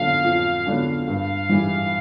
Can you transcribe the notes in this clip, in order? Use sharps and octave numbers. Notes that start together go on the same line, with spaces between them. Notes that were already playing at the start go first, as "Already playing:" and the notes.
Already playing: F2 D3 F#3 B3 D4 F5
F2
D3 F#3 B3 D4
G2 F5
E3 G3